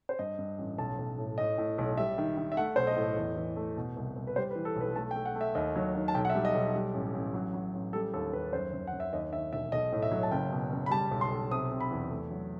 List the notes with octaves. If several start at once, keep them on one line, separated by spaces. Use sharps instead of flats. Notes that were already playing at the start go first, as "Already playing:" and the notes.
C5
G2 D#5
G2
A1
B1 A5
B1
A2
A2 D#5
A2
B1
G3 E5
D#3
D#3
E5
A3 F#5
B1 C5
D#5
A2
E2
E3
A3
B2
C2
C2
B4
G3 C5
B4
E3
A4
B1 B4
A3 A5
G5
A3
F#5
A3
E5
D#2 D#5
F#3
D#3
A5
B1 G5
F#5
E5
G3
D#5
B1
G3
A1
A1
F#3
F#3
A1
G3 A4
D#2 A4
D#2 B4
F#2 C5
F#2
F#2 F#5
E5
D#2 D#5
D#3 E5
E1 E5
B1 D#5
A2
E5
F#3
A5
F#1 G5
B2
F#1
B5
G3 A5
B1
C6
B1
C3 D#6
C3
B5
E2
A3
F#3